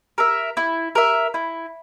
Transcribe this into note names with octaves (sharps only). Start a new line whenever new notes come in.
A#4 E5
E4
A#4 E5
E4